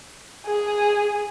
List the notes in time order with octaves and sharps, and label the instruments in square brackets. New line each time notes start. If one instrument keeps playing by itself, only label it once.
[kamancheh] G#4